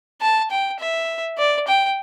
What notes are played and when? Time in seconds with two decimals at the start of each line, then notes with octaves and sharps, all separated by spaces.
0.21 A5
0.51 G5
0.80 E5
1.38 D5
1.68 G5